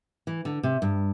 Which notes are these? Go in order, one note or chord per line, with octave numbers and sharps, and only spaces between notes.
E3
D3
C3
G2